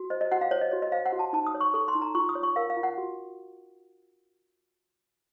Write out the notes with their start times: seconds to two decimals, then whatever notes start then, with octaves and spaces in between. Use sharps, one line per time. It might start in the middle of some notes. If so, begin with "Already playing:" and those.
Already playing: F#4
0.10 C5 D#5
0.21 D#5
0.31 F#4 F#5
0.41 F5
0.51 C5 C#5
0.61 D#5
0.72 F#4 C#5
0.82 D#5
0.92 C5 F5
1.06 F#5
1.12 F#4
1.19 A5
1.33 D#4 A5
1.47 D#6
1.54 C#5
1.61 C#6
1.74 A4 C#6
1.88 C6
1.95 D#4
2.02 A#5
2.15 F4 C#6
2.29 D#6
2.35 C#5
2.43 C#6
2.56 A#4 F5
2.70 F5
2.76 F4
2.83 F#5
2.98 F#4